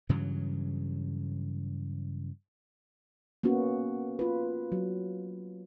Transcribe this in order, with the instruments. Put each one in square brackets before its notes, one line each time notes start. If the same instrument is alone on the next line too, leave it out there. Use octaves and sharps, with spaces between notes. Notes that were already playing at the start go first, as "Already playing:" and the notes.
[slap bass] G2 C#3 E3 F#3
[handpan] A#3 B3 C#4 F#4
F4 B4
F#3